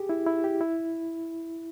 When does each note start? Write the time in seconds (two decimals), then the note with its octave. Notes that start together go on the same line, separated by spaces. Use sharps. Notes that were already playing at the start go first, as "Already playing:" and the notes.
Already playing: G4 G#4
0.09 E4
0.27 E4
0.44 G4
0.61 E4